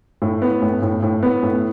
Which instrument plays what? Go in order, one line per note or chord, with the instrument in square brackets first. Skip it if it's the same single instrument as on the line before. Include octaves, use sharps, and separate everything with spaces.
[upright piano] A2
B3
A2
A2
A2
B3
A2